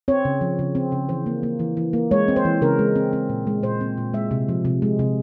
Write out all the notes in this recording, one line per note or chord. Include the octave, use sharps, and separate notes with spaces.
C4 C#5
C#3
F3
C#3
C4
C#3
E3 C5
A#3
A#3
E3
E3
A#3
G#3 C#5
C4
C5
E3
C#3 A#4
G#3
C4
C4
A#2
G#3
A#2 C5
C4
A#2
G#3 E5
C3
F3
C3
G#3
C3